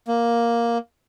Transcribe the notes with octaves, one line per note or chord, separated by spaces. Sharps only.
A#3